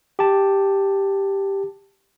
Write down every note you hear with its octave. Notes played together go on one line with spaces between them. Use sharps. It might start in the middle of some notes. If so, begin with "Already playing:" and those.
G4 A5